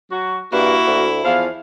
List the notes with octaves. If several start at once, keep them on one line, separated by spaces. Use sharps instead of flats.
F#3 F#4
G2 A#3 E4 F#4
D2
E2 F3 F5